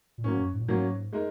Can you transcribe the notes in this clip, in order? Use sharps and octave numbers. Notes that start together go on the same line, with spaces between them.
A#2
G#2 F#3 A#3 C#4
F#2
G#2
A#2
G#2 F#3 A#3 C#4
G#3 D#4 A#4